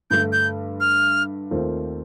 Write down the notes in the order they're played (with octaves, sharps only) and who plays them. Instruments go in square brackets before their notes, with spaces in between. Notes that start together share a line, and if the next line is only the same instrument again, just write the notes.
[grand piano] G2 D3 A3 [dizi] G6
[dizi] G6
F6
[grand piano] D#2 D#3 A3 C4 F4